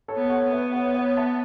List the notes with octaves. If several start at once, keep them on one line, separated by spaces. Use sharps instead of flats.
A4 C#5
B3
C#5 F#5
B3
B4 E5
C#5 F#5
C#5 F#5
E5 A5